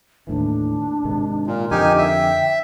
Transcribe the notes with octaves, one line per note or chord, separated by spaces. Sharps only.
D#2 A2 E3 D4
G#2 C3 D#3
A#2 A#4
F2 D3 F3 D#4 G4 G#5
E5 G5